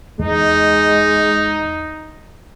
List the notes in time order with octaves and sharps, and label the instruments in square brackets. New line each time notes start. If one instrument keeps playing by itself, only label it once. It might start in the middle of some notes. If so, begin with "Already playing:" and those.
[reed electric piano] E2 [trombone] G#3 [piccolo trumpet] D#4